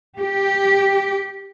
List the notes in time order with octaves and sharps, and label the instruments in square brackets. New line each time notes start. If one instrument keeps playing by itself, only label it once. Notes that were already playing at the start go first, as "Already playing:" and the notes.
[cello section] G4